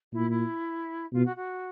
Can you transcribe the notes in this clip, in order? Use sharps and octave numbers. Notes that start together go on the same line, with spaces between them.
A#2 E4
E4
B2 F4
F#4
F#4